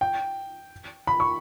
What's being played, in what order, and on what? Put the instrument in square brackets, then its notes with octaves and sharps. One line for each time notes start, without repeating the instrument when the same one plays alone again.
[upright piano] G5
B5
C#6